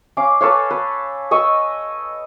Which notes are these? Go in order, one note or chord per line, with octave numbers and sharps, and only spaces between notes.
C#4 F5 D6
A4 B4 C#5 F5
B4
B4 D#5 C#6 E6